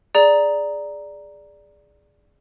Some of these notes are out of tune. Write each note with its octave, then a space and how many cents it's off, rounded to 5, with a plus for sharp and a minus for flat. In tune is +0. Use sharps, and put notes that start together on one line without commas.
G#4 +0 D5 +0 A#5 +0